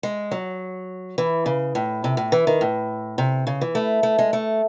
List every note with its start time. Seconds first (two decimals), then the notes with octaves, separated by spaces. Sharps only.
0.03 G#3
0.31 F#3
1.18 E3
1.46 C#3
1.75 A2
2.04 C3
2.17 A2
2.32 E3
2.47 D#3
2.61 A2
3.18 C3
3.47 C#3
3.61 E3
3.75 A3
4.03 A3
4.19 G#3
4.33 A3